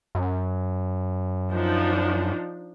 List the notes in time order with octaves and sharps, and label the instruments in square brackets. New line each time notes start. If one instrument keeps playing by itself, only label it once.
[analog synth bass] F#2
[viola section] F3 D4 D#4